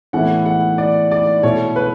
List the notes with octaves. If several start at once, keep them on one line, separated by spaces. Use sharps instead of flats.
A2 E3 B3 E4 F#5
F#5
D5
D5
B2 A3 E4 C#5
B4